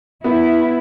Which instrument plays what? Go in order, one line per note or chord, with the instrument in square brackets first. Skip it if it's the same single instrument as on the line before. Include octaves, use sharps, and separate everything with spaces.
[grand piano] B3 [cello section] E4